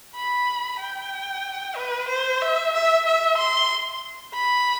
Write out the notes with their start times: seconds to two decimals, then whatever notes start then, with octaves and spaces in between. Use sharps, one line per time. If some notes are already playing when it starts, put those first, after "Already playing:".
0.15 B5
0.80 G5
1.76 B4
2.08 C5
2.41 E5
2.74 E5
3.06 E5
3.37 C6
4.33 B5